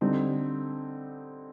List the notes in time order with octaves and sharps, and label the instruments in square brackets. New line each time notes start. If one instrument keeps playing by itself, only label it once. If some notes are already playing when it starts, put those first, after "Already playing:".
[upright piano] D3 G3 C4 D#4